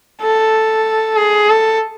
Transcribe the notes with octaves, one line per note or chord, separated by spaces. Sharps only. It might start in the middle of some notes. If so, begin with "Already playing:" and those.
A4
G#4
A4